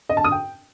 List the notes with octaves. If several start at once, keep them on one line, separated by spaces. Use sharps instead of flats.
D#5
A5
D#6
G5